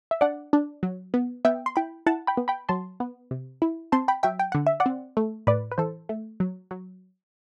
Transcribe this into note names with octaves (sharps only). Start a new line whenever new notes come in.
E5
D4 D5 F#5
D4
F#3
B3
B3 E5 G5
C6
E4 G5 B5
E4 F#5 A5
G5 B5
B3
G5 B5
F#3 A5 C6
B3
C3
E4
C4 A5 C6
G5 B5
F#3 E5 G5
G5
D3 F#5
E5
D5 F#5
C4
A3
A2 B4 D5
B4
E3 A4 C5
A3
F#3
F#3